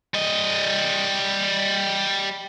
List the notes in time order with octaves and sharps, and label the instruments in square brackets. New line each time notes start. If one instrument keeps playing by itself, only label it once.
[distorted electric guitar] G3 D#5